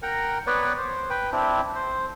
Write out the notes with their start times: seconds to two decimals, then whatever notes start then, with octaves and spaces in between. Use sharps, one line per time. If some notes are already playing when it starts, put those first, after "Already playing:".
0.02 A#4 F#5 G5 A#5
0.47 B3 B4 C#5 D5
0.78 C5
1.10 B4 G5
1.32 C4 D4 E4
1.75 C5